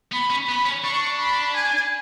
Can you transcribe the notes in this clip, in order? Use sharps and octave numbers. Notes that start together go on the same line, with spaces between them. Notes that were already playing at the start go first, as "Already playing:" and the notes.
B3 B5
C#4
B3 B5
C#4
D4 C#6
B5
G#5